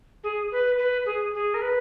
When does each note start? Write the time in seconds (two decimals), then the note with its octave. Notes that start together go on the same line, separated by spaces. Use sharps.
0.23 G#4
0.51 B4
0.78 B4
1.05 G#4
1.33 G#4
1.53 A#4
1.61 B4